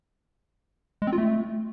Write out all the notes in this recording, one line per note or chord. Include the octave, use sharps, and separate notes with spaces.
G#3
C4
F4
A3